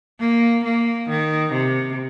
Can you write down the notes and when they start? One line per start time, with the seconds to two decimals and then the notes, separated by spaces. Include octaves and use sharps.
0.19 A#3
0.64 A#3
1.09 D#3
1.53 C3